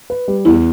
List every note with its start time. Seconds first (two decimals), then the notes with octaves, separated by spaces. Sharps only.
0.10 B4
0.28 G3
0.45 E2 E4